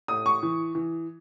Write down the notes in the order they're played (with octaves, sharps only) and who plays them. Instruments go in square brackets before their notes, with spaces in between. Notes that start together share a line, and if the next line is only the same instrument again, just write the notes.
[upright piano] A2 D#6
C#6
E3
E3